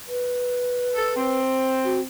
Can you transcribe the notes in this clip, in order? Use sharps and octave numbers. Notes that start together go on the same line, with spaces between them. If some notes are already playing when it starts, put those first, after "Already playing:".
B4
A4
C4
F#4